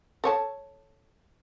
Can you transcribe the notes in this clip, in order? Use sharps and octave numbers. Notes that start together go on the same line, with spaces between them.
A4 C#5 A5